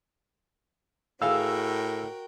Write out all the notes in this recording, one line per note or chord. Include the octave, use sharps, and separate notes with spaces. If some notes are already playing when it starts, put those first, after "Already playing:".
A2 F#4 G#4 A#4 F5 G5 E6